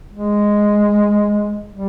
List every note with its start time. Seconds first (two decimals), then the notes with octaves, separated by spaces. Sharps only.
0.13 G#3
1.73 G3